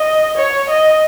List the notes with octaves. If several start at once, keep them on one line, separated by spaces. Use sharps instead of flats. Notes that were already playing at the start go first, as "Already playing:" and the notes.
Already playing: D#5
C#5
D#5